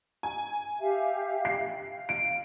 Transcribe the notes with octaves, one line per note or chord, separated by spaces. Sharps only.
G#5
G4 E5 F5
C7
F5
D7